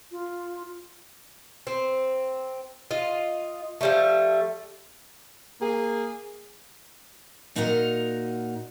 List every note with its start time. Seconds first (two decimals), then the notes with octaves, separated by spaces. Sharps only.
0.12 F4
1.67 C4
2.91 F4 D#5
3.81 F3 G3 A3
5.61 A#3 G#4
7.56 A#2 D#4 F#4 A#4 F#5 A#5